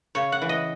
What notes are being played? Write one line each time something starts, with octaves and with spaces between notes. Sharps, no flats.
C#3 C#5
F#5
E3
D#5